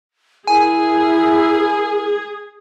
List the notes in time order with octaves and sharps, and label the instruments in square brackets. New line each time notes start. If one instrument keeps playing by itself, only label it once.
[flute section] E4 A#4 [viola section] G#4 [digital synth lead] G#5